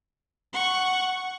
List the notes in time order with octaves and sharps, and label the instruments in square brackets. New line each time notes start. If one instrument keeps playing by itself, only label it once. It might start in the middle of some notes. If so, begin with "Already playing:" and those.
[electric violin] F#5 C#6